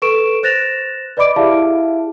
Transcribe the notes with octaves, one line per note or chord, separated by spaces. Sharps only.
A4 B4 C#6 D7 E7
C5 F#6 A6 A#6 E7 F7
B4 D5 D#5 B5 D6 D7
E4 G4 G#4 E5 F5 A5